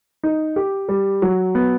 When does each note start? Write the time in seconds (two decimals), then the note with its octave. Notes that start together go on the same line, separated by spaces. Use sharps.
0.23 D#4
0.56 G4
0.89 G3
1.22 F#3
1.55 B3